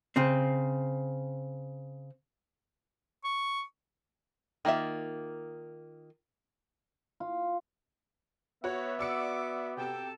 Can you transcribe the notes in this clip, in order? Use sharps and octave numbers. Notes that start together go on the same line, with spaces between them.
C#3 C4
C#6
D#3 A#3 F4 E5
F4
B3 F#4 C#5 E5
F#4 D5 D6 E6 C#7
C3 G4 A4 G5 A5